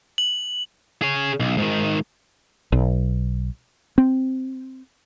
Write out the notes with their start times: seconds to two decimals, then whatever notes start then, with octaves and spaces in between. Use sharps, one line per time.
0.18 F#7
1.02 G#4 C#5
1.40 B1
1.58 G#2 D#3
2.72 B1
3.98 C4